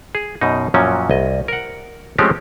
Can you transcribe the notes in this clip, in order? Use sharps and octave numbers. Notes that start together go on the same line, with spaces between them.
G#4
F#2 B2 D#4
F#2 A#2 F3 F#3 C#4
C2 D#5
A#4 F#5
F3 G#3 A3 C4 C#4 G4